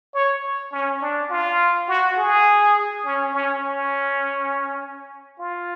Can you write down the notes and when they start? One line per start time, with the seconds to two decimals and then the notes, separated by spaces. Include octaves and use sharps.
0.14 C#5
0.72 C#4
1.02 D4
1.30 F4
1.88 F#4
2.17 G#4
3.05 C#4
3.34 C#4
3.64 C#4
5.39 F4